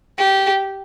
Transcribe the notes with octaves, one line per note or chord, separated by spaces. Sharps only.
G4